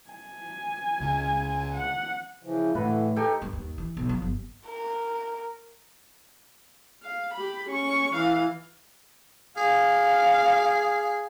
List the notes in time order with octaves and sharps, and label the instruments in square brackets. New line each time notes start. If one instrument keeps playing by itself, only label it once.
[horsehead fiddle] G#5
[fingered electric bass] C#2 C#3
[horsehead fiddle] F#5
[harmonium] C#3 E3 F3
[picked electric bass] A2 [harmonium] D3 E3 [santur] B4
[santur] D#4 G4 A4 [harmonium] G#5
[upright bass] G2
D#2
E3
B1
F3
G1
[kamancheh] A#4
[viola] F5
G4 B5
C#4 C#6
E3 F5
[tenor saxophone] G#4 [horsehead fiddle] F5